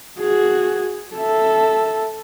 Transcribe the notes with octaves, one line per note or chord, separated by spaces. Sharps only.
F#4 G#4
A4 E5